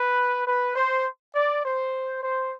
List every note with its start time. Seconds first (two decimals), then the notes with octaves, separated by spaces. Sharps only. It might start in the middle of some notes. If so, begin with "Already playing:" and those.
Already playing: B4
0.46 B4
0.76 C5
1.35 D5
1.64 C5
2.23 C5